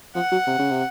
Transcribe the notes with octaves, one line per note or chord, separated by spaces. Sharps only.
F3 F#5
F#3
C3
C#3
C3